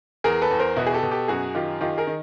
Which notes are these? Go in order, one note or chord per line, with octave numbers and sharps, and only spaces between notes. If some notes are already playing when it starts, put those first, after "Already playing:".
E2 G#4 A#4
A4 B4
E2
A#4 C5
B2 E4 F#4
G#4
G4 A4
B2
G4 A4
F#2 F#4 G#4
D#3 F4 G4
D#3 F4 G4
G#4 A#4
D#3